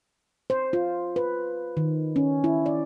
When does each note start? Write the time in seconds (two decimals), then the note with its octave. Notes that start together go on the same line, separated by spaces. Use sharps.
0.50 C5
0.73 F4
1.16 B4
1.77 D#3
2.16 C#4
2.44 E4
2.66 D5